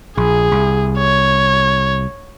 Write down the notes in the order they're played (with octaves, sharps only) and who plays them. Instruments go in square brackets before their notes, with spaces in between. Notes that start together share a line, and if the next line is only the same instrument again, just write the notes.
[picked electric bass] A#1 [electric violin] G#4
[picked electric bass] C2
[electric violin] C#5